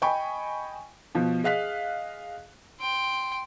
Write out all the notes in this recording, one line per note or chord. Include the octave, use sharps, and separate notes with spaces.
D#5 G5 G#5 B5 C#6
B2 F3
G#4 D#5 F5 F#6 B6
G5 C6